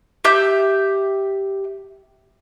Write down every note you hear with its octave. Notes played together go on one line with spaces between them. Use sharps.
G4 E5 G6